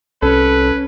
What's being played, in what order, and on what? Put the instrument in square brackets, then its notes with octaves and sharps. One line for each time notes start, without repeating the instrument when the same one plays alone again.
[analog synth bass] C2 [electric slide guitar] C#4 [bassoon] A4 [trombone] B4